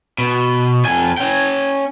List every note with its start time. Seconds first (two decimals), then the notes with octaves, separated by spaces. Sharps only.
0.18 B2
0.85 F2 G#5
1.18 C#4 G5